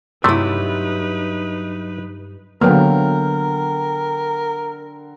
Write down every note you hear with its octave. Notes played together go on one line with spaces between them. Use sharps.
G2 C3 F#3 A3 D#4 E4 B4
D3 F#3 A#3 B3 A#4 G5 F6